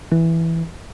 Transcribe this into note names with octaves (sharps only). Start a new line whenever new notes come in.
E3